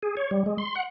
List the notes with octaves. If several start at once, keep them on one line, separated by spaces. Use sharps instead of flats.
G#4
C#5
G3
G#3
C6
F#5